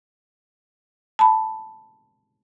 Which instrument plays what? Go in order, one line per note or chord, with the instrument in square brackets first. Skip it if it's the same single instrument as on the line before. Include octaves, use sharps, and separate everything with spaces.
[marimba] A5 B5